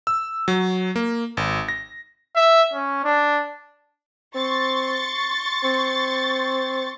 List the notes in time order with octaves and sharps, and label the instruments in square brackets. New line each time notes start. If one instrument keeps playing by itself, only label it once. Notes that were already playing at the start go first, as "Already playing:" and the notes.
[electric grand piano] E6
F#3
A#3
G#1
A#6
[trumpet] E5
C#4
D4
[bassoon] C4 [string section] C6 C#6 A6
[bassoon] C4